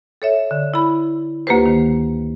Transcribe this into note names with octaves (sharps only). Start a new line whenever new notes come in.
A4 C#5 E5
D3
E4 B5
D2 A#3 F4 G4 B4 C5
D#3